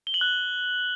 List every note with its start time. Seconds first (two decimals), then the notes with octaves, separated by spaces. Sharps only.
0.07 G7
0.14 F#7
0.21 F#6